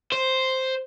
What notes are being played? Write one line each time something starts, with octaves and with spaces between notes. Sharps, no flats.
C5